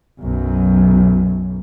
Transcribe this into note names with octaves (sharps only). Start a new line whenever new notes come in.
B1 F#2